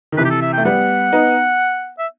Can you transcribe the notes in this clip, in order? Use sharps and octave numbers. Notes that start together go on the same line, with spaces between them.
D#3
C3 E3 B4
G4
A4
E5
A3 G5
G3 B3 F#5
B3 D#4
E5